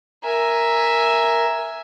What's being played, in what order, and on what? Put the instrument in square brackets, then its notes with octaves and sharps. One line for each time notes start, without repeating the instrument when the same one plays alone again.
[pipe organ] A#4 [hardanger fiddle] E5 G#5